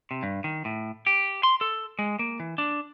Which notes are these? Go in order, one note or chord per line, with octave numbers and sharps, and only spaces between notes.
C3
G2
D#3
A2
G4
C6
A4
G#3
A#3
E3
D4